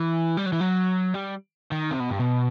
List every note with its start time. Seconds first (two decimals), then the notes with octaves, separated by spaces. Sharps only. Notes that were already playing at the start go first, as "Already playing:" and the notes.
Already playing: E3
0.37 G3
0.46 F#3
0.52 E3
0.61 F#3
1.14 G3
1.72 D#3
1.91 C3
2.00 B2
2.10 G2
2.20 B2